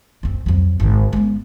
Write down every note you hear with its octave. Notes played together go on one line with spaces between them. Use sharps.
F#2 C4
F2 F#3
G#1 D3
G#3 B3